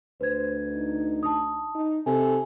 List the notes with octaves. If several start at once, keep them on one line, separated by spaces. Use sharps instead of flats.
D2 B4 C5 G#6
D#4
A5 D#6
D#4
C3 A4 G#5